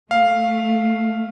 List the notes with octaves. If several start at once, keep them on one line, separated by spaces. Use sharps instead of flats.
A3 F5